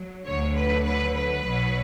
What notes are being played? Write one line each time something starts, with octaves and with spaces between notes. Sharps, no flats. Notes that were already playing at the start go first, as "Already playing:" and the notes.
Already playing: F#3
D2 D3 F#3 C#5
B4
B4
B4
B1 B2 F#3